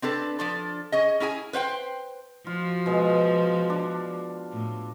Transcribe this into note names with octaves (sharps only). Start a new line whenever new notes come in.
C4 D4 A4 B4
F3 D4 A4
C#4 G#4 D#5
C#4 E4 G#4 G#5
B4 C5 F5 G5
F3 F4 F#4
B2 G#3
D4
A2